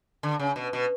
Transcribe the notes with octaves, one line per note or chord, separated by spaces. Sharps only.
D3
C#3
B2
B2